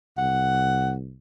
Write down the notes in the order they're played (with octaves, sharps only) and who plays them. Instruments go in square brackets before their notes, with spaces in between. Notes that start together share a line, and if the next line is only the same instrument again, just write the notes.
[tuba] C2 [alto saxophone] F#5